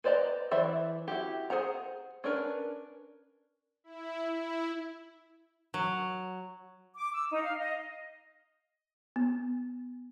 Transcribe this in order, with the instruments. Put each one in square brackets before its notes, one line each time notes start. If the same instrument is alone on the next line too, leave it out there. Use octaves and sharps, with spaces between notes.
[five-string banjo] B4 C5 D5 D#5 A#5
E3 C5 D5 E5
E4 F#4 G4
G#4 A#4 C5 F#5 A#5
C#4 D4 A#4 B4
[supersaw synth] E4
E4
[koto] F#3
[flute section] D6
E6
D#4
F5
D#5
[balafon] B3